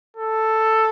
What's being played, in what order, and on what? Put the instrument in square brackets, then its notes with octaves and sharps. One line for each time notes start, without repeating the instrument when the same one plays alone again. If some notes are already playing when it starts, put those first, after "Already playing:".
[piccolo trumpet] A4